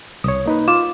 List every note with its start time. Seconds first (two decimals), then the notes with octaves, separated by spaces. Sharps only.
0.24 C2 C#5 D#6
0.46 A#3 D#4 B4
0.68 F4 D6 E7